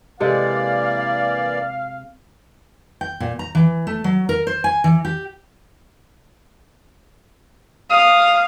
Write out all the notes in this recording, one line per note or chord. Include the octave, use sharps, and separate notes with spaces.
C3 E3 G#3 A#3 A4 D5 F5
G5
A#2
A#5
E3
A3
F#3
A#4
C5
G#5
E3
G4
F5 D#6